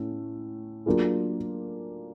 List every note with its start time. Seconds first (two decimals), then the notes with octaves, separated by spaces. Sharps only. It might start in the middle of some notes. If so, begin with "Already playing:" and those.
Already playing: A2 A3 C#4
0.86 F#3 A#3 D4 F4 G#4